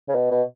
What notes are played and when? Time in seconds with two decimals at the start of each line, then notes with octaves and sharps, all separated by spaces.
0.08 C#3
0.15 B2
0.31 B2